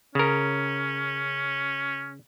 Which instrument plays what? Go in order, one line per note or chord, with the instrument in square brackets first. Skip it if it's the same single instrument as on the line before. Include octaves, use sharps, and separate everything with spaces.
[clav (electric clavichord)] C#3 A#4 [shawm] C#4